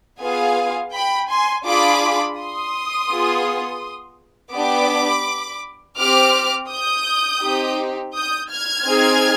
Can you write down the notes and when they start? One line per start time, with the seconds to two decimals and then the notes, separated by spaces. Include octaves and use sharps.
0.21 B3 F4 G#4 F5 G#5
0.94 G5 B5
1.30 G#5 C6
1.66 D4 F4 G#4 B5 D6
2.37 C6 D#6
3.10 B3 F4 G#4
4.54 B3 D4 G4 B5 D6
5.98 C4 G4 D6 F6
6.70 D#6 G6
7.43 C4 D#4 G4
8.14 D#6 G6
8.50 F6 G#6
8.87 C4 D#4 G#4